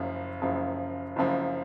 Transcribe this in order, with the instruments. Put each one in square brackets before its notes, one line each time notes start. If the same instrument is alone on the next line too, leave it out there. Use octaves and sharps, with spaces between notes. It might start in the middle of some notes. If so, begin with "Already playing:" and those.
Already playing: [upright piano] F#1 F#2 C#3 F3
F#1 F#2 C#3 F3
F#1 F#2 C#3 F3